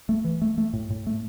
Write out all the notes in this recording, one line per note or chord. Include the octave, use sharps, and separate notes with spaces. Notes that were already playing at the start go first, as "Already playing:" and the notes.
A3
E3
A3
A3
A2
A2
A3